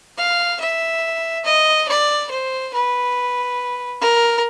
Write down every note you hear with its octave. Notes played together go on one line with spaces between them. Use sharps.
F5
E5
D#5
D5
C5
B4
A#4